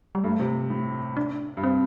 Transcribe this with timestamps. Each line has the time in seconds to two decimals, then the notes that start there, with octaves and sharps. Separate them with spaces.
0.15 G3
0.24 G2 A3
0.39 C3
0.70 A2
1.17 D4
1.57 G2
1.63 C4